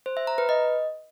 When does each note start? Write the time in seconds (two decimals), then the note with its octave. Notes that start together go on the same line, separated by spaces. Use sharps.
0.06 C5
0.17 E5
0.27 A#5
0.38 B4
0.49 D#5